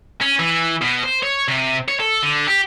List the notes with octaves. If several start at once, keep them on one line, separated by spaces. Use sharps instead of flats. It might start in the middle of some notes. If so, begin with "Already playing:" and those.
C#4
E3
B2
C5
C#5
C3
C#5
A4
D3
G4